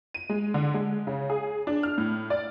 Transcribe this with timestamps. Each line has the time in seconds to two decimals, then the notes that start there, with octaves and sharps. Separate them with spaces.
0.14 D#7
0.29 G#3
0.54 D3
0.74 G#3
1.07 C#3
1.30 G#4
1.67 D4
1.83 F6
1.98 A2
2.30 D5